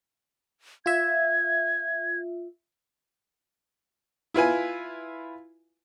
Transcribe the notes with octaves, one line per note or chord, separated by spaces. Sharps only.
F4 E5 G#6
E4 F4 B4 G#5